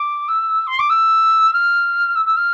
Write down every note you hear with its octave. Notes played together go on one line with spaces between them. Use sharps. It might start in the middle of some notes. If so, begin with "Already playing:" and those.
Already playing: D6
E6
C6
D6
E6
F6
E6
E6
F6